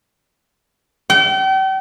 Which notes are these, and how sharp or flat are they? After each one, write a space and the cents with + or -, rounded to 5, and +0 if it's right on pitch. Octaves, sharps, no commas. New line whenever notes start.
G5 -40